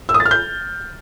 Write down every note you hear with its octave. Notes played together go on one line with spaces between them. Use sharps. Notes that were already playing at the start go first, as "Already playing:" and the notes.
E6
D#6
A6
F6
G6